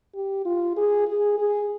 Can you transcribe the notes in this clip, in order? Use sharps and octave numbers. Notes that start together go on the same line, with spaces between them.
G4
F4
G#4
G#4
G#4